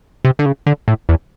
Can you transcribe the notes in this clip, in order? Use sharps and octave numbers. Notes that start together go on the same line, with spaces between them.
C3
D3
C#3
D3
A2
E2